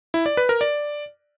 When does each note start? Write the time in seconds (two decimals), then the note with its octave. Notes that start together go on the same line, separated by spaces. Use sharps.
0.14 E4
0.26 D5
0.37 B4
0.49 A#4
0.61 D5